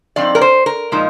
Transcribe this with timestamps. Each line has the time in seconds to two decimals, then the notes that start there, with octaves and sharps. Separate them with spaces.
0.16 G2 F3 C4 D#4 D5
0.35 A#4
0.41 C5
0.66 A#4
0.92 A#2 F3 G#3 D#4